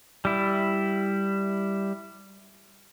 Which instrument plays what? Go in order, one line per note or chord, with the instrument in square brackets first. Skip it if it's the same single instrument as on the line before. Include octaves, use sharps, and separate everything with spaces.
[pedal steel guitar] G3 E4